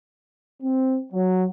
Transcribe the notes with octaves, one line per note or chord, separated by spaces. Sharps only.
C4
F#3